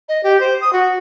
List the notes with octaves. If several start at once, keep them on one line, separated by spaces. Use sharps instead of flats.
D#5
G4
C5
D#6
F#4